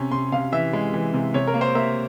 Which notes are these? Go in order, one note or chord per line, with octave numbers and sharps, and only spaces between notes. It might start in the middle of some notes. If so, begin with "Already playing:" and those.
Already playing: C3 C#4
C3 C6
C3 F5
E3 E5
G#3
E3
C3
C3 C#5
A#4
A#3
C5
A#3 E5